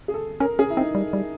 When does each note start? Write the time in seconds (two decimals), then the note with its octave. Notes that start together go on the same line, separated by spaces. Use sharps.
0.08 G#4
0.14 A4
0.40 C#4 A#4
0.59 C#4 G#4
0.70 E4
0.77 C4 D#4
0.95 G3
1.13 G3